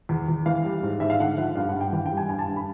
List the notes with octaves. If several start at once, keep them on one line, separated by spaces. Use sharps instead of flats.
E2
E2
E3 F5
G3
G#2
G#2 E5
F5
D3 F#5
F3 F#5
G2 F5
F#5
G2
G5
E3 G5
G5
G3
G#5
G2 G#5
A5
G2
B5